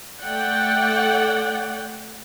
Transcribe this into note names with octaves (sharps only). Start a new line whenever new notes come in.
A3 D5 F#5 G5